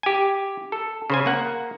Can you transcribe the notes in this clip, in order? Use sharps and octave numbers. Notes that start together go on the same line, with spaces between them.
G4 G#5
A4
C#3 C5 G#5
A#3 F#5